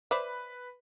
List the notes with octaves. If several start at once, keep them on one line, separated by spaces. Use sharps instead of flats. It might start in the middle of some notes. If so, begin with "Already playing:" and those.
B4 C5 D5 E5 B5